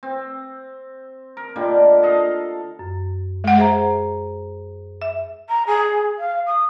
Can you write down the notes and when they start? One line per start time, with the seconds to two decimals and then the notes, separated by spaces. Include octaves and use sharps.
0.03 C4
1.37 A#4
1.56 A#2 D3 D#3 G3
2.03 A4 D#5 F5
2.79 F#2
3.44 G#3 F#5
3.58 G#4 C5 E5 A#5
5.02 E5
5.49 A#5
5.67 G#4
6.19 F5
6.47 D#6